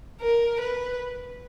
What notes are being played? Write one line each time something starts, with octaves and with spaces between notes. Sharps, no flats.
A#4
B4